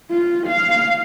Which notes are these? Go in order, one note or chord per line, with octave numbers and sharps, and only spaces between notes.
F4
F5